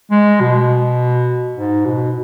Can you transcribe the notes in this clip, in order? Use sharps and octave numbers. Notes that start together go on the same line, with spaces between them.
G#3
B2
G#2
B2